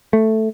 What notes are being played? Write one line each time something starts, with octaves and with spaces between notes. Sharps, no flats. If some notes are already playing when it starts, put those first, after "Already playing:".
A3